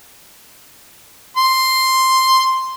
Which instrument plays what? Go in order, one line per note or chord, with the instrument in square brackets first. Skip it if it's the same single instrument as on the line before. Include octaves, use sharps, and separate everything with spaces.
[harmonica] C6